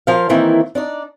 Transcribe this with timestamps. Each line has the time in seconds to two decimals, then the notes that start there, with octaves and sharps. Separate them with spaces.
0.07 F3 A#4 F5
0.29 D#3 E3 A#3 C4 E4
0.75 D4 D#4 D5